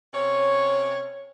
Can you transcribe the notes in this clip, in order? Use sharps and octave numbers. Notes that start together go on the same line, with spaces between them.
C3 C#4 C#5